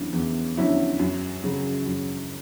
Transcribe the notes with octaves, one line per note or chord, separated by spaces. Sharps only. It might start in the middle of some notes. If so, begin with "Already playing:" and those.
Already playing: E2 D3 F#3 C#4 E4
E2
D3 F#3 C#4 E4
F#2
C#3 F#3
F#2